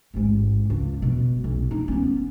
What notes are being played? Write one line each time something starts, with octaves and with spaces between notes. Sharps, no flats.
A1 G#2
C#2
B2
B1
D#4
B3 C#4